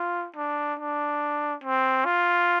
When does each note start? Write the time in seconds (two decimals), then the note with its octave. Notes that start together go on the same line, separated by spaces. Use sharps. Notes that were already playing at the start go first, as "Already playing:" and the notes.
Already playing: F4
0.36 D4
0.79 D4
1.64 C4
2.05 F4